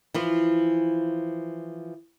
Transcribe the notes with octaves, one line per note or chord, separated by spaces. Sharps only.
E3 F3 F4